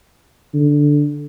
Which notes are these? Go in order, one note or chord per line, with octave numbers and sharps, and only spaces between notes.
D3